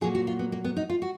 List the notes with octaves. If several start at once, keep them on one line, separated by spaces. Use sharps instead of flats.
A#2 F#3 A#3 G#4
F#4
F4
B3
A#3
B3
D#4
F4
F#4